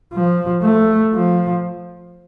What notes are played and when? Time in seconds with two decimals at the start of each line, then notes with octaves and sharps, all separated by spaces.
0.13 F3
0.63 A3
1.14 F3